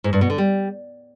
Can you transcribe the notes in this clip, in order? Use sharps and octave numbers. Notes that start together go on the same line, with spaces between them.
G#2
G2
B2
D3
G3